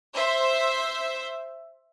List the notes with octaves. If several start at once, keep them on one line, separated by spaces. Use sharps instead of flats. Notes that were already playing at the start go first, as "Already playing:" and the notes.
C5 E5